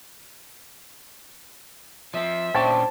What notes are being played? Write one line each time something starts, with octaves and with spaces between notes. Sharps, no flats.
F3 C4 E5
A#2 C#4 D4 C5 G5 A5 C#6